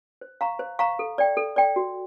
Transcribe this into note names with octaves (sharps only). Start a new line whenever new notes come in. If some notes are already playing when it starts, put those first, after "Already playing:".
C5
F5 A#5 C#6
C5
F5 A#5 C#6
A4
D5 G5
A4
D5 G5
F#4